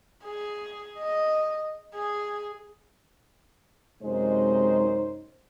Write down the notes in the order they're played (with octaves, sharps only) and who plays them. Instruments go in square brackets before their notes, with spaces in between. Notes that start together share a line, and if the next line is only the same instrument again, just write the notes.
[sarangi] G#4
D#5
G#4
[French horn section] F#2 C3 G#3 D#4 C5